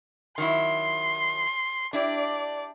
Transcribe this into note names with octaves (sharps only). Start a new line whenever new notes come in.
D#3 F#3 E4 C6
D4 E4 G4 D5